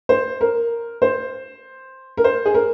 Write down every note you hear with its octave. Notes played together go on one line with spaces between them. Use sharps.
C5
A#4
C5
A#4
C5
G#4
A#4